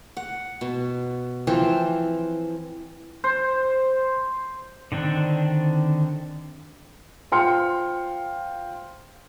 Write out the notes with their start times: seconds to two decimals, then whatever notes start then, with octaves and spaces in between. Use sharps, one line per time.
0.17 F#5
0.61 B2
1.47 E3 F3 C4
3.24 C5
4.92 D3 D#3 C4 D4
7.32 F4 C5 G5 C6 F6 C#7